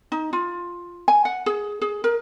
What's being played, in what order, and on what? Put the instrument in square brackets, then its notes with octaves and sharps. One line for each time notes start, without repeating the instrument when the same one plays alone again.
[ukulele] D#4
F4
G#5
F#5
G#4
G#4
A#4